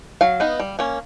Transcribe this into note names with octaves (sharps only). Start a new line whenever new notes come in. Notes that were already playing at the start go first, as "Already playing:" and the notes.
F#3 F5
B3 D#4
G3
A#3 C#4